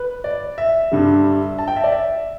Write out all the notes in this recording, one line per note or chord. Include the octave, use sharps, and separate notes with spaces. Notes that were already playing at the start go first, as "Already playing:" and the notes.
Already playing: B4
D5
E5
G2 D3 G3
A5
G5
E5
D5
E5